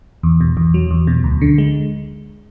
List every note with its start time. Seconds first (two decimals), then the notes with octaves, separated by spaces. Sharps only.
0.23 E2
0.41 B2
0.57 E2
0.74 F#3
0.91 E2
1.07 B2
1.24 D2
1.42 D3
1.58 G#3